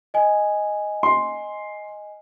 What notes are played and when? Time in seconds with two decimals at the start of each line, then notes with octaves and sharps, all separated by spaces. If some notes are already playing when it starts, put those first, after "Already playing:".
0.14 D#5 G#5
1.03 C6